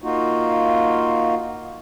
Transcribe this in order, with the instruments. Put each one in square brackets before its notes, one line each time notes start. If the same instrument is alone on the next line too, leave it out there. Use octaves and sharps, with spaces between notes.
[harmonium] A#3 D#4 F4 F#4